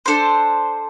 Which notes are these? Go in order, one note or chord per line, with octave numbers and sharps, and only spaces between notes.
D4 A4 C5